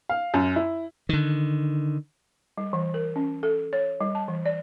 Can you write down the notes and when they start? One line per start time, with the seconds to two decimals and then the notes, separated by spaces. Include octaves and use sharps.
0.09 F5
0.34 F#2
0.56 E4
1.09 D3 D#3
2.58 G3
2.73 E3
2.94 A#4
3.16 C#4
3.43 A4
3.73 C#5
4.01 G3
4.15 A5
4.28 E3
4.46 D5